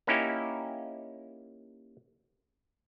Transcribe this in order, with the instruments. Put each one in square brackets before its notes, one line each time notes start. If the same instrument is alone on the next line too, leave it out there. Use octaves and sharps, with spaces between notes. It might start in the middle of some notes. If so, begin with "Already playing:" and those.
[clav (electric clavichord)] A#3 C#4 D#4 E4 G4